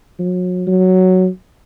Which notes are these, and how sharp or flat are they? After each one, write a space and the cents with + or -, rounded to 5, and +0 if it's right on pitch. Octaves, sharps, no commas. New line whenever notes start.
F#3 -35
F#3 +5